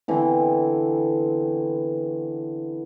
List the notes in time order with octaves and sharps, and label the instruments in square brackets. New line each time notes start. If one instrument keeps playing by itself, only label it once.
[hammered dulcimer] D3 E3 B3 C4